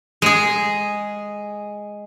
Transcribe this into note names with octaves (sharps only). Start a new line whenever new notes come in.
G#3 G#4